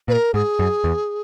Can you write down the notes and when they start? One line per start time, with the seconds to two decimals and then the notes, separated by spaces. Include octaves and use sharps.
0.08 A#2 B4
0.13 A#4
0.34 G#2 G#4
0.59 F#2
0.84 E2